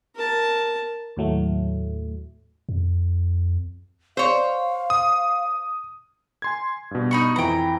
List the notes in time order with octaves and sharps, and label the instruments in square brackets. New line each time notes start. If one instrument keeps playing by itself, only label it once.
[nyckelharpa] A#4 A5
[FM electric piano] D#2 A2 F#3 A3
[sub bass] F2
[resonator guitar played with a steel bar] C5 C#5 [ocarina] F5
[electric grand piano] D#6
G#5 C6 G#6
G2 B2
[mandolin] D#4 B5 C#6
[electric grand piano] F2 E3 B5 [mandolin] G5 A#5